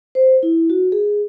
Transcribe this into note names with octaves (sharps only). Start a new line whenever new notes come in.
C5
E4
F#4
G#4